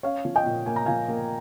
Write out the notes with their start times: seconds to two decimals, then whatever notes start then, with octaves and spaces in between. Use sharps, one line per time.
0.03 C#4 C#5 F5
0.25 F3
0.36 D#5 G5
0.46 A#2
0.66 A#3 G#5
0.76 A#5
0.86 F3 F5 G#5
1.08 A#3